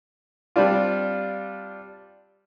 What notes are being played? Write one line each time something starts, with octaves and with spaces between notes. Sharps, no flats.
G3 C4 D4 F4